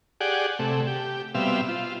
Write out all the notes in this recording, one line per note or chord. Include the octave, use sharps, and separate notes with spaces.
G4 G#4 D5 F#5
C3 A3
G4
B2 G3 C4 E5 F5
F4